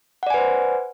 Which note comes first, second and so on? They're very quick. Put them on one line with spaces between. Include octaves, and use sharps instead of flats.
F#5 D5 G#5 B4 C5